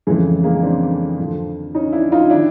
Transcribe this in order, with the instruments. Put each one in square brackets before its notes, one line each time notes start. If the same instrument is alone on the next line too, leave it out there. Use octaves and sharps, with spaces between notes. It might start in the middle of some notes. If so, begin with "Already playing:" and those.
[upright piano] F2 C#3 E3 G#3
G#3 A#3
C4 D4
F2 D3 F3
C#4 D#4
D4 E4
D#4 F4
D#3 D4 E4